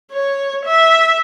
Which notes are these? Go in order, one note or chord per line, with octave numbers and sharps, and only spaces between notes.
C#5
E5